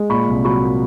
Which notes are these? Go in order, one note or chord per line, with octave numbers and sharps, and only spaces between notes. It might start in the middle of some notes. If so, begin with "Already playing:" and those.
Already playing: G#3
A#2 B5 C#6
C2
F#3 B5 C#6
A#3